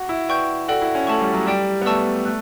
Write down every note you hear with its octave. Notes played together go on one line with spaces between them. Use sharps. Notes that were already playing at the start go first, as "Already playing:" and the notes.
Already playing: F#4
E4
B4 D5 G5 C#6 G6
F#4 A4 D5 G5
E4
C#4
A3 A4 E5 A5 C#6
G3
F#3
G3 G4 D5 G5
B3
A3 D5 A5 C#6 E6
A3 F#6